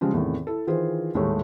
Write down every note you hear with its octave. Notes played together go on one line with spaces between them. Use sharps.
C#3 F3 G3 G#3
E2 A2 C3 D#3
E4 A4
D#3 E3 F4 G#4 C5
D#1 D#2 A2 G#3 A3 C#5